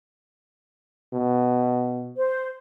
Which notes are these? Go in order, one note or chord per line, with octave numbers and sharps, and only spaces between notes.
B2
C5